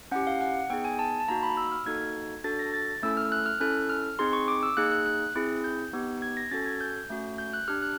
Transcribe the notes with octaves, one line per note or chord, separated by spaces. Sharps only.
C#4 E4 G4 F#5
F5
F#5
B3 D#4 G#4 G5
G#5
A5
A5
A#3 D#4 F#4 A#5
B5
E6
F6
A#3 D#4 F#4 A4 G#6
D4 F#4 A4 A6
A#6
A6
A3 C#4 E4 A4 E6
F6
F#6
F6
C#4 E4 A4 F#6
F6
C4 D#4 G#4 C6
C#6
D6
E6
A#3 D#4 G#4 F#6
F#6
F#6
C4 E4 G#4
G6
B3 D#4 G4
G#6
A#6
C#4 F#4 A4 A6
G#6
G6
A3 C#4 F#4
G6
F#6
D4 G4 F6
F#6